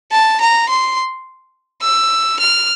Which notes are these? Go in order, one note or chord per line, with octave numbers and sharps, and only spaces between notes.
A5
A#5
C6
E6
F6